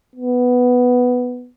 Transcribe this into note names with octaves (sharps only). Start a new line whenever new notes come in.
B3